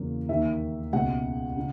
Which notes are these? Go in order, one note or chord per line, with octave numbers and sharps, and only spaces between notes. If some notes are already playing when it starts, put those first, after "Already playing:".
Already playing: E2 C#3 F#3 A#3
D#2 D#3 A#3 E5
C#2 B2 G#3 F#5
C#3